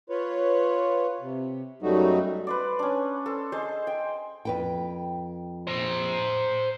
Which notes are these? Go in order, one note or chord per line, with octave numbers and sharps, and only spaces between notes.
F4 B4 C#5
C3
F#2 F#3 G3 A3 D#4 F#4
B4 C5 D5
C#4 D4
A4 C5
G#4 C5 D#5 A5
G5 G#5
F2 B4 G5
C5 A#5